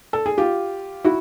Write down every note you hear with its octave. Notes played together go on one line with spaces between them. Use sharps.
A4
G#4
F4 G4
E4 F#4